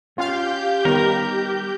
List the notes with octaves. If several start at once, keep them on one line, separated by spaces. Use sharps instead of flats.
C#4 F4 G4 F5 G6
D#3 G3 B3 A#4 C#5